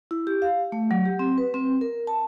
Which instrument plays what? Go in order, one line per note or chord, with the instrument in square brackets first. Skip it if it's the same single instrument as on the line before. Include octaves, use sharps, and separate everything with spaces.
[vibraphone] E4
G4
F5
A3
F#3
G4
C4
B4
C4
A#4
A5